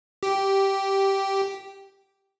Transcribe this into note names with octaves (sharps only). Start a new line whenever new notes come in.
G4